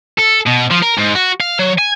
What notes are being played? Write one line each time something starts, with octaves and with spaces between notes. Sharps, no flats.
A4
B2
F3
A#4
G#2
F#4
F5
F#3
G#5